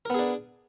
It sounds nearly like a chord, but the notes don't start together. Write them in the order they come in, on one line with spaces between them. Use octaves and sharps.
A#4 B3 G#4 D4